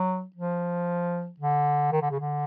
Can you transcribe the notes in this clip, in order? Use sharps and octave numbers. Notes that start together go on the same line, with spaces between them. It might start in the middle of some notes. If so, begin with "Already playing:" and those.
Already playing: F#3
F3
D3
D#3
D3
C#3
D3